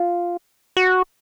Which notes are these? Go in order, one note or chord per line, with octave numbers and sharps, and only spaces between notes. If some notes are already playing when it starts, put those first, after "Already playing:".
Already playing: F4
F#4